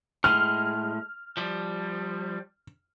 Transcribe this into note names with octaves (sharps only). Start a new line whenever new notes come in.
A2 G#3 F6
F3 G3